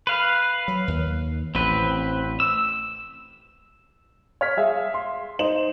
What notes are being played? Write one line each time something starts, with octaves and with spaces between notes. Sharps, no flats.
B4 F5
F#3
D#2
A1 C4 B4
E6
C#5 F6 B6
G#4 E5 F5
C6
D#4 C5 E7 F#7